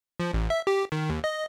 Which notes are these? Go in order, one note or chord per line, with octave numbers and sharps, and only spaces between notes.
F3
A1
E5
G4
D#3
D#2
D#5